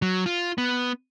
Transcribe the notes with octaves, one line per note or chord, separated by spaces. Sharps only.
F#3
F4
B3